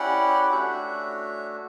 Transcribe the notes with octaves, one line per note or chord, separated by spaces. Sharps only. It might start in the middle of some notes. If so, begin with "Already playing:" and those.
Already playing: C#4 E4 G4 D5 F#5
F#5
A3 D4 F#4 C#5 E5